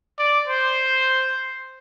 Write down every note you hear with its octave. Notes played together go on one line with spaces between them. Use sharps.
D5
C5